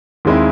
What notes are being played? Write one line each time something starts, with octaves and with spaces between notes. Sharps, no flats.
D#2 D#3 G#3 C4 E4